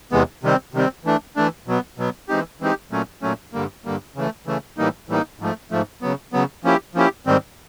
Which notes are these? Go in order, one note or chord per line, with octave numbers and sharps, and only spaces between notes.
E2 C3 E3 G#3 B3
C3 D#3 G3 C4
C3 D#3 G3 C4
E3 A3 D4
E3 A3 D4
B2 F#3 B3
B2 F#3 B3
E3 G#3 C4 D#4 G4
E3 G#3 C4 D#4 G4
A#2 F#3 A3 C#4
A#2 F#3 A3 C#4
G2 D3 G3 A#3
G2 D3 G3 A#3
C#3 E3 A3
C#3 E3 A3
A2 E3 G3 A#3 D#4
A2 E3 G3 A#3 D#4
G#2 F3 A3
G#2 F3 A3
C#3 F#3 B3
C#3 F#3 B3
F3 A#3 C#4 E4 G4
F3 A#3 C#4 E4 G4
G#2 D#3 G3 C4